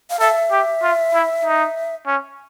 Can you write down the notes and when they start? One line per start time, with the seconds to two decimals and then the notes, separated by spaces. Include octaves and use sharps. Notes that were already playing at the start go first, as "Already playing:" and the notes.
0.10 F5
0.20 A4 E5
0.51 G4
0.83 F4
1.14 E4
1.45 D#4
2.07 C#4